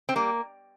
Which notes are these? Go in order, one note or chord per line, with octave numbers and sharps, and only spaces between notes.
C4
G3 A#3